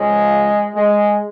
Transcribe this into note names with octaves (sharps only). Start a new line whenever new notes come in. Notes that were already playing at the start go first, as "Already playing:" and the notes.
Already playing: C#2 C#3 F3 G#3
G#3